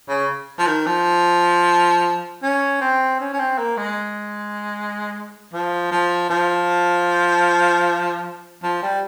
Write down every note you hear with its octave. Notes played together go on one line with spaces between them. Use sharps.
C#3
F3
D#3
F3
C#4
C4
C#4
C#4
C4
A#3
G#3
F3
F3
F3
F3
G3